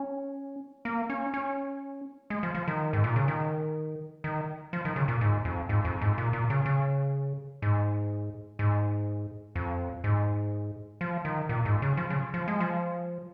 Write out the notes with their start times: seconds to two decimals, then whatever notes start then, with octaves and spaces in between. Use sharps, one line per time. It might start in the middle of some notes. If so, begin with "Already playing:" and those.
Already playing: C#4
0.85 A#3
1.10 C#4
1.34 C#4
2.30 G#3
2.43 F3
2.55 F3
2.68 D#3
2.93 G#2
3.04 A#2
3.16 C#3
3.28 D#3
4.24 D#3
4.73 F3
4.85 D#3
4.96 C#3
5.08 A#2
5.21 G#2
5.45 F2
5.69 G#2
5.85 F2
6.02 G#2
6.18 A#2
6.33 A#2
6.50 C#3
6.66 C#3
7.62 G#2
8.59 G#2
9.55 F2
10.04 G#2
11.01 F3
11.25 D#3
11.49 A#2
11.65 G#2
11.82 C#3
11.97 F3
12.10 C#3
12.34 F3
12.48 G#3
12.60 F3